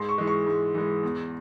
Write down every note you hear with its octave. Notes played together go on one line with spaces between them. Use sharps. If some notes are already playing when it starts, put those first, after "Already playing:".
Already playing: G#2 C6
C#6
E3 G#3
C#6
G#2
E3 G#3
E2